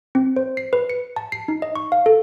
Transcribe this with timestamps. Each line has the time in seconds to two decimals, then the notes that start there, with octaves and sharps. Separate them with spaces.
0.15 C4
0.36 C5
0.57 C7
0.73 B4
0.90 C#7
1.16 A5
1.32 C7
1.48 D#4
1.62 D#5
1.76 C#6
1.92 F5
2.06 A4